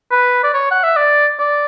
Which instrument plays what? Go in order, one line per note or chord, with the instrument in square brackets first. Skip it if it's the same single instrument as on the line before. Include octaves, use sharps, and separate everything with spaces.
[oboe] B4
D5
C#5
F#5
E5
D5
D5